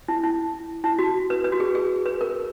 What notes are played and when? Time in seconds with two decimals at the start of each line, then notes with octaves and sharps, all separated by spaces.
0.08 E4
0.24 E4
0.84 E4
0.99 F#4
1.30 B4
1.44 B4
1.52 F#4
1.60 G#4
1.75 G#4
2.06 B4
2.21 A#4